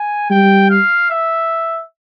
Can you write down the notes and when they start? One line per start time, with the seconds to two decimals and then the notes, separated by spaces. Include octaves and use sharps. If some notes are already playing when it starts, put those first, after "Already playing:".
Already playing: G#5
0.30 G3 G5
0.70 F5
1.10 E5